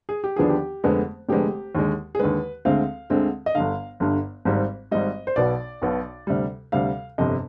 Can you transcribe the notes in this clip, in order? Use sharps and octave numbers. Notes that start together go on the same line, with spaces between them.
G#4
G4
D#2 D3 F3 B3 D4 G#4
G4
F1 F2 D3 G#3 B3
F1 F2 D3 G#3 B3 G4
D#2 D3 G#3
G#4
D#2 D3 G#3 B4
D2 D3 G#3 C4 F5
D2 D3 G#3 C4
D#5
G1 G2 D3 F5
G1 G2 D3
G#1 G#2 G3
G#1 G#2 G3 D#5
C5
B1 B2 B3 D5
B1 B2 B3
D2 C3 G3
D2 C3 G3 F5
G1 F2 C3 D#5